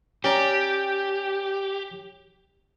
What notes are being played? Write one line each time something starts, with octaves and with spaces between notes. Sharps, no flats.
C#4 G4 D5 A#5